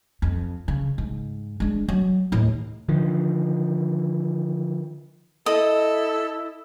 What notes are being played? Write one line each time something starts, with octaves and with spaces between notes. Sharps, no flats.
F2
C#3
G#2
G#3 D4
F#3
D#2 A2
D3 D#3 F3
E4 A4 D#5